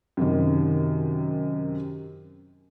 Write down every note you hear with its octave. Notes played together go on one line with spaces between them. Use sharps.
F#2 C3 D#3